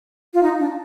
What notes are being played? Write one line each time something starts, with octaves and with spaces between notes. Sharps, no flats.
F4
D#4
D4